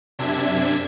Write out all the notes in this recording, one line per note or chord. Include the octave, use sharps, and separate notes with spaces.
F#2 C3 D4 E5 G#6